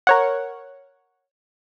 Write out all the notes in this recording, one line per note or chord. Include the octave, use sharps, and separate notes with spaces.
A#4 C#5 F#5